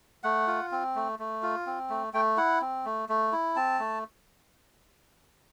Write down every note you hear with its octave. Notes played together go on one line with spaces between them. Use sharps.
A3 F#5
F4
C4
A3
A3
F4
C4
A3
A3 G5
E4 F#5
C4
A3
A3
E4
C4 A5
A3